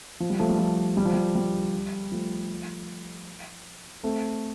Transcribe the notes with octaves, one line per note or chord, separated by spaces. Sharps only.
F3
G3
F3 A3
G3
F3
G3
F3
G3
G3
F3 A3
A3 C4